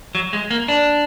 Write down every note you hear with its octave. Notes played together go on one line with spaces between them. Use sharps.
F#3
G#3
A#3
D4